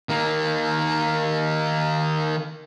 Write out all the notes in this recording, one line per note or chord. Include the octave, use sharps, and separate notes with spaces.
D#3 A#3